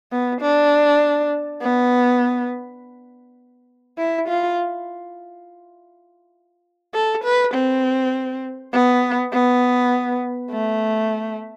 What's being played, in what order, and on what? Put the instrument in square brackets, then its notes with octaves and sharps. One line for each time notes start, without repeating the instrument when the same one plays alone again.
[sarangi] B3
D4
B3
E4
F4
A4
B4
C4
B3
B3
A3